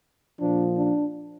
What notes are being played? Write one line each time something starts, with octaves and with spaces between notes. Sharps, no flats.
A#2 F3 D4
D4